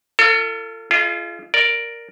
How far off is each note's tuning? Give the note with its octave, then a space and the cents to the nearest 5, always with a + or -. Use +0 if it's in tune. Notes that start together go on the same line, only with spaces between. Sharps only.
F4 -20 A4 +35
F4 -30 G#4 +40 D#5 +0
A#4 +0 D5 +0